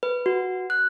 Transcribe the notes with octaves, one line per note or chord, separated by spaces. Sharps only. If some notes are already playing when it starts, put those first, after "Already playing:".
B4
F#4
F#6